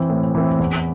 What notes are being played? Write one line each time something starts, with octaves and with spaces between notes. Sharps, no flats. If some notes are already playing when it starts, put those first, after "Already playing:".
Already playing: E3 C4
A2
E3 C4
E2